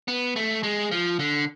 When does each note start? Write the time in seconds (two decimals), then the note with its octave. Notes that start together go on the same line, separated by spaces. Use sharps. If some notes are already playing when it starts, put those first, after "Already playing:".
0.08 B3
0.36 A3
0.63 G#3
0.91 F3
1.19 D3